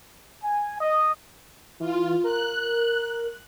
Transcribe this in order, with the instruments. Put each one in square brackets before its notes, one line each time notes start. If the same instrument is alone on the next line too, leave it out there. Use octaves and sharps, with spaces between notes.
[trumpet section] G#5
D#5
[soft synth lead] E3 [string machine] F4
[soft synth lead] A#4 [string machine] F#6